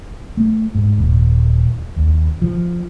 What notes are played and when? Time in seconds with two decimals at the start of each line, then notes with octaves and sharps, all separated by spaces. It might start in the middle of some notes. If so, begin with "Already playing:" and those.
0.37 A3
0.75 G#2
0.98 D#1
1.96 D#2
2.42 F3